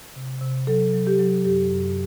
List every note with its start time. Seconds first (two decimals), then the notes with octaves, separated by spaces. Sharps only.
0.16 C3
0.41 C3
0.67 F#3 A4
0.94 F#3
1.07 G4
1.19 F#3
1.45 F#2 G4
1.71 F#2